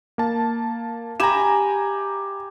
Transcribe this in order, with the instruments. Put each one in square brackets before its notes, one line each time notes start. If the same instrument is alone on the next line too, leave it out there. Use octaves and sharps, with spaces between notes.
[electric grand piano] A#3 A5
[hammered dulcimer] G4 G#5 B5 [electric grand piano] A#5 E7